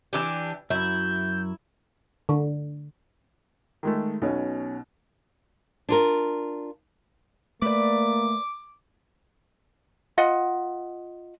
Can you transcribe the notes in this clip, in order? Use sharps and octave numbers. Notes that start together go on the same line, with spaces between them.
E3 D4 G4
F#2 F#3 E4 G6
D3
D#3 G#3 A3
B1 B2 C#4
D4 F4 A#4
A3 A#3 B4 D5 D6
F4 D#5 F#5